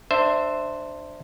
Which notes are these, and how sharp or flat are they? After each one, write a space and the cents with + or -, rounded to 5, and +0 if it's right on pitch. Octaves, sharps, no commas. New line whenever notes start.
D4 +20 C5 +0 E5 +0